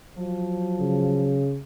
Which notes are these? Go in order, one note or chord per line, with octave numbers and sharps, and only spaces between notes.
F3 F#3
C#3